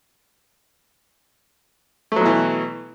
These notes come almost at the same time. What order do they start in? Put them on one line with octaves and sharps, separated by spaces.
A3 F#3 B2 E3